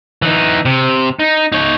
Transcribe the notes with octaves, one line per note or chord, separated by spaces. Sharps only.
E3 D#4
C3
D#4
D#4 C#5